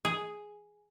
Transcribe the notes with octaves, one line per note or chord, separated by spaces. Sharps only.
G#4